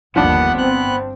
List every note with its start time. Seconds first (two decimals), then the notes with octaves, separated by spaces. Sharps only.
0.16 G1 D#2 F3 B3 D4 F#5
0.58 C4 F#6